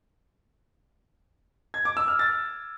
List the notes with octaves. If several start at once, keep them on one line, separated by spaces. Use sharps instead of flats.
G#6
D6
E6
F6
A6